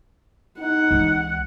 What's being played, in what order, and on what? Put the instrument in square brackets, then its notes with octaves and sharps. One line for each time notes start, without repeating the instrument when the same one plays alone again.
[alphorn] D#4 [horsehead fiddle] F#5
[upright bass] C#2 E3